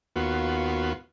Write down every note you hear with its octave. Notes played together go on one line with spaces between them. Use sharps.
D#2 B3 F4 F#4